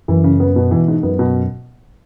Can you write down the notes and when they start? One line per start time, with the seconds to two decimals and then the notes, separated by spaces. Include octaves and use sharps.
0.08 F#2 E3
0.24 C#3
0.40 B3
0.56 B2
0.71 E3
0.88 G#2
1.03 F#2 B3
1.19 B2